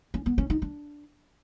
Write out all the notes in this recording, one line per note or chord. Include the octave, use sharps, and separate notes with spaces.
C#4
B3
C#4
D#4
D4